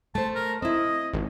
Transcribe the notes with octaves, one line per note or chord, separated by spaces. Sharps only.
A3 C5 A5
A#4
C4 E4 D#5
G#1